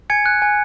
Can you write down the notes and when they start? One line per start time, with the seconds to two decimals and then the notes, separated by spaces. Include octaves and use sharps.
0.10 G#5 G#6 C#7
0.26 F#6
0.42 G#5